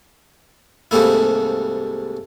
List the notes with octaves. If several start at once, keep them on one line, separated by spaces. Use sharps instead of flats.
C2 G#2 G3 A3 A#3 E4